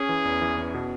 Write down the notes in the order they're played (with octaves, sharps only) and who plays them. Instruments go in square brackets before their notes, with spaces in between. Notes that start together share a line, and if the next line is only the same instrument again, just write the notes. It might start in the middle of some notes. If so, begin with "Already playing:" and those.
Already playing: [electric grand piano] C#4 [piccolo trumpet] G#4
[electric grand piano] E3
E2
E3
C#4
B2